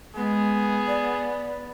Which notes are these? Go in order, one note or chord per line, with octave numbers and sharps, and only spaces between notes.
G#3 B3 G#4
D5